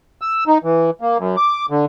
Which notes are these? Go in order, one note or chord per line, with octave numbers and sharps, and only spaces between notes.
E6
D#4
E3
A#3
F#2
D6
D3